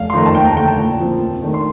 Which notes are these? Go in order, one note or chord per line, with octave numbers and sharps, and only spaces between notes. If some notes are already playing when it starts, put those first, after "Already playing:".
Already playing: F1 F5
C6
F2 D#3 A3 A#5
A5
D#2 G5
A#5
A5
D3 A3 G5
A5
A#2
F3 C4
D#2
D#3 A3 D4
C6